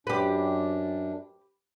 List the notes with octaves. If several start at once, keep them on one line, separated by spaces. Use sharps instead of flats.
F#2 D4 G4 B4